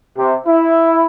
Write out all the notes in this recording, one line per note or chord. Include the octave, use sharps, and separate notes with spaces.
C3
E4